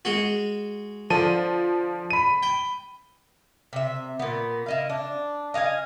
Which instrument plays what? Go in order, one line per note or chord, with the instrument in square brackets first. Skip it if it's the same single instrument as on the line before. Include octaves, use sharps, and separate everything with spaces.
[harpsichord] G#3 F#4
[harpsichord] D3 [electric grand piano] F3 A5 D#7
[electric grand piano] B5 D#7
[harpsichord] G5
[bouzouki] C3 E5
A#2 B3
E4 D#5 F5
D4
D#5 F5 F#5 G#5